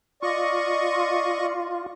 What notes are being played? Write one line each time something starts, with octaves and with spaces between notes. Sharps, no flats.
F4 D5 D#5 C#6